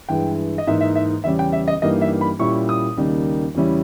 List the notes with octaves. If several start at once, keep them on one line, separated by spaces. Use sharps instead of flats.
G2 E3 G#3 G5
D#5
G#2 E3 A#3 D#4 E5
E5
E5
E2 C#3 G3 C#4 E5
G5
E5
D#5
G2 E3 G3 A#3 D#4 D#5
E5
B5
A#2 G3 C#4 E4 C#6
D#6
D#2 C#3 G3 A#3 D#4
E2 C#3 G3 C#4 E4